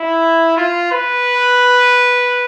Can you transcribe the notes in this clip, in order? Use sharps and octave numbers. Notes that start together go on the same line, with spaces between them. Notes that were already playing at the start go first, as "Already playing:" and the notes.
Already playing: E4
F4
B4